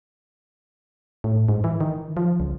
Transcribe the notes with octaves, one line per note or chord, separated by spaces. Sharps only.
A2
G#2
E3
D#3
F3
C#2